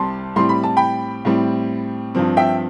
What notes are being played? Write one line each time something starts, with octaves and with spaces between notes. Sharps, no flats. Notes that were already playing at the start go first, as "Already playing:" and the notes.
Already playing: C2 C3 G3 C4 A5 C6
A2 G3 C4 C6
B5
A5
G5 B5
A2 G3 C4
G2 F3 C4
E5 G5